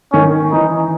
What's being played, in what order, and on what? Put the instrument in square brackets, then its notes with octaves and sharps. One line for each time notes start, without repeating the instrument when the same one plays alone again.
[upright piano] D#3 [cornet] C#4
[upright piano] E3 [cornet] D#4